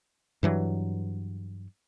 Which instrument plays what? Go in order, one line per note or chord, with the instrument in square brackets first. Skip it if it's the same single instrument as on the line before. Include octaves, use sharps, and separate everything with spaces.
[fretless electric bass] G2 E3 F#3